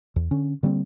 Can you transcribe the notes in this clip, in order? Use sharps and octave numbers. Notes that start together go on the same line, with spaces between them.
E2
D3 C#4
D3 G3 A#3 C4